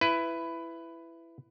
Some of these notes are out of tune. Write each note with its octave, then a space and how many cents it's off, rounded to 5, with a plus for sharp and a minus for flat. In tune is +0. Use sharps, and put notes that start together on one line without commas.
E4 +15 B4 +15